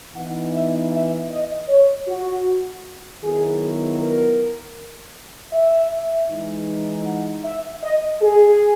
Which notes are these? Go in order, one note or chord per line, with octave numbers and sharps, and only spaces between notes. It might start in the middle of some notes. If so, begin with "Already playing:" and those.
E3 B3 D#4 F#5
E5
E5
D#5
C#5
F#4
D#3 F#3 B3 E4 G#4
A#4
E5
E3 G#3 D#4
F#5
E5
D#5
G#4